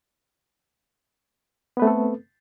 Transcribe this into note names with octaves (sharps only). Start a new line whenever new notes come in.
A3 B3 C4 A4 B4